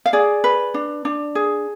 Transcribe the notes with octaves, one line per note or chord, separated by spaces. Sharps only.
F5
G#4 D5
B4
D4
D4
G#4